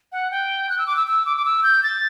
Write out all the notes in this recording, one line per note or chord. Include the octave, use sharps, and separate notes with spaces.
F#5
G5
F#6
E6
D6
E6
E6
D6
D6
E6
G6
A6